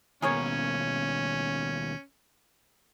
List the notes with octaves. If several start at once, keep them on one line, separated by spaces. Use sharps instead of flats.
D#2 B2 C#4 G#4 A#4 C#5